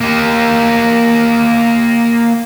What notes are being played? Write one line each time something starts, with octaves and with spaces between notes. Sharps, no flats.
A#3 G4